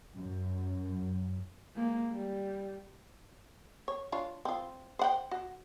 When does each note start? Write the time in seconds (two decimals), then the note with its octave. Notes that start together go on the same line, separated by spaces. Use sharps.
0.16 F#2
1.75 G#3 A#3
2.12 G3
3.88 C#5
4.12 D4 F4 C#5
4.45 C4 F4
4.99 C5 F#5 G5
5.31 F#4